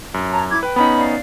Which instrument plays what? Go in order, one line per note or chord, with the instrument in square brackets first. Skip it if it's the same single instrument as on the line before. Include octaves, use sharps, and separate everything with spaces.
[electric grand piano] F#2
[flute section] C#5 A5 A#5
E4 D6 G#6
[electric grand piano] B4 [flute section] G5
[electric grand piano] B3 C#4 D#4 [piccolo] B5
[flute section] D5 F5